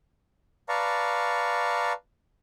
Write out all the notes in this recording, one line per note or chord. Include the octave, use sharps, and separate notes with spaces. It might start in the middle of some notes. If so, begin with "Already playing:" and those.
B4 D5 F5 A5 A#5 C#6